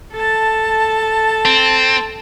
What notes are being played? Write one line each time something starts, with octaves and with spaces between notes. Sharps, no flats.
A4 A5
C4